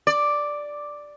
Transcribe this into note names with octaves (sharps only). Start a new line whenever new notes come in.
D5